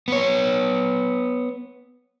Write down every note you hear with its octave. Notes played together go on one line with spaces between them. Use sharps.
B3 C#5